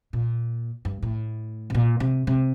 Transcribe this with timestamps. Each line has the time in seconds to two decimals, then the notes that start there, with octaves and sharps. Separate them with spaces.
0.13 A#2
0.85 G2
1.02 A2
1.70 C3
1.75 A#2
2.00 C3
2.27 C3